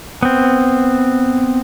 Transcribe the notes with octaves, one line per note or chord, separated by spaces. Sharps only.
B3 C4